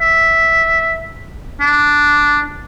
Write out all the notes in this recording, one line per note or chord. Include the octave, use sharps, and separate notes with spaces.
E5
D4